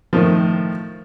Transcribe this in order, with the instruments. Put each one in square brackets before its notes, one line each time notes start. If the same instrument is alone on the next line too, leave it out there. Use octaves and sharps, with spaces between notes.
[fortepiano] A2 D#3 F3